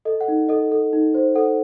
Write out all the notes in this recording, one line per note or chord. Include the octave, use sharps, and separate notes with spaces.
A4 D#5
F#5
D#4
A4 D#5
A4
D#4
C5
A4 F#5